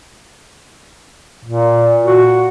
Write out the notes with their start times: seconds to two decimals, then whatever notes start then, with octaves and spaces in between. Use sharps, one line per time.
1.45 A#2
2.04 F#4